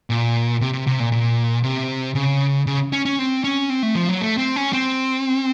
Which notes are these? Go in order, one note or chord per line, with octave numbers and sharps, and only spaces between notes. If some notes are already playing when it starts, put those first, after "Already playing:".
A#2
C3
C3
C3
A#2
A#2
C3
C#3
C#3
C#4
C#4
C4
C#4
C4
A3
F3
F#3
A3
C4
C#4
C4